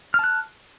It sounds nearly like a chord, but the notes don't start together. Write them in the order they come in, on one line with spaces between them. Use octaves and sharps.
F6 A5 F#6